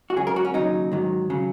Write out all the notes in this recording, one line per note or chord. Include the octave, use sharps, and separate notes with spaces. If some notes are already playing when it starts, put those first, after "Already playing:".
F#4
C#2 C#3 F#3 G#4
A#4
F#4
C#4
D#2 C#3 F#3 D#4
G#2 D#3 F#3
C#3 F#3